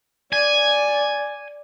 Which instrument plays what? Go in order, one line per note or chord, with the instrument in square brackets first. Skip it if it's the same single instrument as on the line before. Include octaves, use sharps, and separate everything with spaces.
[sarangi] D5 [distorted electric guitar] G#5